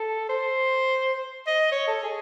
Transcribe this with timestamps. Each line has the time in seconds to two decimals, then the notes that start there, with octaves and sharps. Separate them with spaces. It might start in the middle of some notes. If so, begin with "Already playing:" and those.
Already playing: A4
0.29 C5
1.47 D#5
1.72 C#5
1.87 A4
2.04 G#4